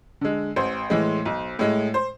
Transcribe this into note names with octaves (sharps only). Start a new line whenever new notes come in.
D3 G#3
A1 C5
A2 E3 G#3
B1
A2 G#3
C5